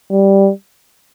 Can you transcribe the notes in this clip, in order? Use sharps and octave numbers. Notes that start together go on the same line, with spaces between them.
G3